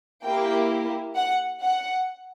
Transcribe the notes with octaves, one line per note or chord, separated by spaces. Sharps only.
A#3 E4 G4 G5
F#5
F#5